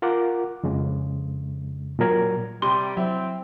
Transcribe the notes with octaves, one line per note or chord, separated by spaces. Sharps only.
F4 A#4 F#5 D6
F2 C#3 G#3
A#2 F#3 A#4 G#6
C3 G3 C6
F#3 C4 E4